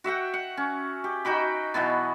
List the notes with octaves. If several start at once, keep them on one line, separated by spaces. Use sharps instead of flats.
F#4 E5 F#5 G5
F#5
C#4
G4
D#4 F#4 G5 B5
B2 E3 F#3 B3